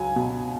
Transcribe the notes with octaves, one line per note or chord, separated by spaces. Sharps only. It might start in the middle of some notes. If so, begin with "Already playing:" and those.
Already playing: C#2 F#3 G#5
B2